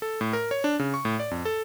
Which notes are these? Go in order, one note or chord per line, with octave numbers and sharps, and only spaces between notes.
A4
A2
A#4
C#5
D4
C#3
C#6
A2
D5
F2
A4